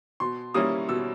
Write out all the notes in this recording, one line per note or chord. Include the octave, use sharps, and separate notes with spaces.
B2 C6
G3 A#3 C#4 E4 D#6
B2 E6